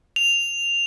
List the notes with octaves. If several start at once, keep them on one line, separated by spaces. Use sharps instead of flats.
F7